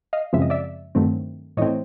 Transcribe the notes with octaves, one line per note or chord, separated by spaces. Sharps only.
D#5 F5
F#2 C#3 F3 G#3 C4 E5
D#5
D5 E5
G2 D#3 F#3 A3 C4
A2 E3 A3 C4 C#5 D#5